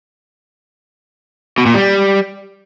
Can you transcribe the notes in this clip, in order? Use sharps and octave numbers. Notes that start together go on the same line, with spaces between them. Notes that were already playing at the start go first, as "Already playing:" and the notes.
B2
A#2
G3